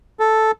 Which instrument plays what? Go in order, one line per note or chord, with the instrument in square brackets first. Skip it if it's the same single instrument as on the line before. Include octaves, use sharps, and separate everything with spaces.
[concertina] A4